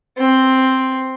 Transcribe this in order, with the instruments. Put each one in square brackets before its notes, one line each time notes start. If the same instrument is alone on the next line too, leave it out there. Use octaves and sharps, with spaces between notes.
[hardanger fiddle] C4